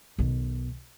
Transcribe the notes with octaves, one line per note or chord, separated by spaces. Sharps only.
B1 D#3